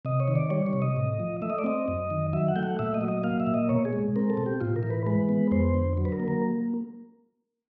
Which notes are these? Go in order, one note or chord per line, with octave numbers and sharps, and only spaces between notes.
C3 D#5
C#5
D#3
D5
G3 C#5
C#5
C3
D#5
A2
F3
A3 E5
D#5
D5
C4 D#5
F#2
D#3
F#3 E5
F#5
A3 G5
F#5
A#2 E5
D#5
F#3
D#5
A#3 F5
E5
A#2
D#5
B2 C#5
G#4
G#3
C4 A#4
A4
B2
G4
A2 F4
A#4
E3
B4
G#3 B4
B3
F2 C5
D3
F#3
B4
A#4
A#3
A#4